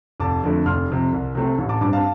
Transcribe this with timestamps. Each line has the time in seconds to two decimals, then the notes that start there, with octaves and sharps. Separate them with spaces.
0.20 F1 A5 D6
0.44 F2 D3 A3
0.66 F1 C6 F6
0.90 F2 C3
1.12 C2
1.35 C3 A3 C4
1.58 A1
1.69 A5 D6
1.81 G2 G3 C4 A5 D6
1.93 F5 A5